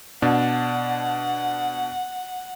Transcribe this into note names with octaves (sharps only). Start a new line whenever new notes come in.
B2 D4 F#5